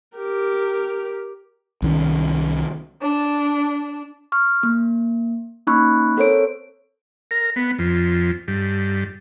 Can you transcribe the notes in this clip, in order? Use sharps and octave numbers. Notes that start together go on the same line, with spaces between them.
G4 A#4
C2 D#3 C#4
D4
C#6 F6
A#3
A#3 C#4 D#4 B5 C#6 F#6
C4 A4 A#4 C5 C#5 D7
A#4
B3
F2
G2